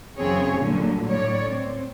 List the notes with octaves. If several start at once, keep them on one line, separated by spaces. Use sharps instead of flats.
F#2 C#3 E3 C4 G#4 C#5
A#2 D3 F#3 G3 A3
A2 C#5 D5
C4